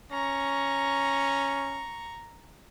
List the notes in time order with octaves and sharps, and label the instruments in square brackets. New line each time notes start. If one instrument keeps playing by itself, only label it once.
[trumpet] C#4 [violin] A#5 C#6